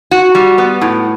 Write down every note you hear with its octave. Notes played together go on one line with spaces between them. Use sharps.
F#4
G3
B3
A2